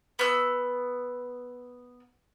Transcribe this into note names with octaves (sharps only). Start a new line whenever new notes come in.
B3 E6